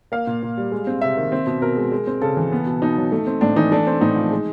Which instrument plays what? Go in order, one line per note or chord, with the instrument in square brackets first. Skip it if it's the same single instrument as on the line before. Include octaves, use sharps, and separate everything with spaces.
[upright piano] A#3 F5
A#2
A#2
G3
G#3
C4
C3 E5
D#3
C4
B2
B2 A#4
G#3
G#3
C4
C#3 A4
E3
B3
B2
B2 D#4
F#3
A3
C4
A2 D4
E3 D#4
A3 D4
C4
A2 D#4
F3
G#3